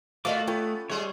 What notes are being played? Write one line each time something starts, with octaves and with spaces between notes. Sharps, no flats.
A2 A3 B3 F4 F#4 D#5 F#5 D6
B3 C#4 F4 A4 G5
G3 G#3 B3 G#4 C#5